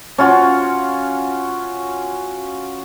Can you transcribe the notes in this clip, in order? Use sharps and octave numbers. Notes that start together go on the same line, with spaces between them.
C#4 F4 F#4